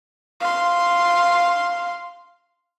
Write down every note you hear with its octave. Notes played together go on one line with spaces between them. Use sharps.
F5 C6